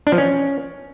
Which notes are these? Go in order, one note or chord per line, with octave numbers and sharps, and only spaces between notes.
D4
F3
C#4